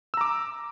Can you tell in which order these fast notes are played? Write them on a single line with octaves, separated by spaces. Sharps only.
E6 A#5 D6